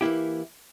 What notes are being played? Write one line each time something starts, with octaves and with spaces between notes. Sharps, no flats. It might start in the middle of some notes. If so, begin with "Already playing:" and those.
E3 A#3 E4 G4